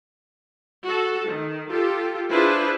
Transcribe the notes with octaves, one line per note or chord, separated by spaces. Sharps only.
F#4 A4
D#3
F4 G4 A4
D4 E4 F4 G#4 B4 C5